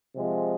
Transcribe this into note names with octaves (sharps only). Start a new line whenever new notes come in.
C3 F3 G#3